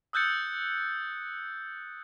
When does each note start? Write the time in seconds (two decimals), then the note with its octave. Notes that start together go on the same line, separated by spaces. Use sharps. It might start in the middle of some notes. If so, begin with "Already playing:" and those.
0.13 D#6 E6 F#6 G6 A6 C#7